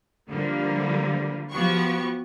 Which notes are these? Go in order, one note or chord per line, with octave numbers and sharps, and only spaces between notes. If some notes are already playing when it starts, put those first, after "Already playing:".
D3 E3 F3 G3 A#3
F3 B3 F#4 G4 C#6